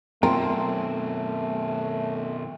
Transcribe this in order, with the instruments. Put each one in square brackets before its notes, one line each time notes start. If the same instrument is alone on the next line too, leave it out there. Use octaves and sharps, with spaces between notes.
[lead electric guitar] F#2 B2 [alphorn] A3 [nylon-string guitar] C4 [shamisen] F4 A#4